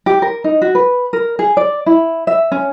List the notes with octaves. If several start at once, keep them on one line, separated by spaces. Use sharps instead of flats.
G4
A#4
D#4
F#4
B4
A#4
G#4
D5
E4
E5
C#4